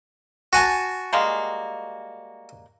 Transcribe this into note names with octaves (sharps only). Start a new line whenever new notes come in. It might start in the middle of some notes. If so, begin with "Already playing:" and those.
F#4 G#5 A5
G3 G#3 A#3